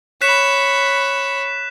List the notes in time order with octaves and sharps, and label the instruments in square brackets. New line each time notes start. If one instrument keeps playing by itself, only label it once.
[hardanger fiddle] C#5 B5 [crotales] F#6 B6 E7